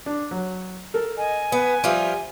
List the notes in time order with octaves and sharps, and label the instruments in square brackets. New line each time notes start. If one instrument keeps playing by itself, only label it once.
[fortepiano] D4
F#3
A4 A#4
[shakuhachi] D#5 [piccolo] G#5
[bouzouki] B3 [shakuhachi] B4
[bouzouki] F3 G3 F4 [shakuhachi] E5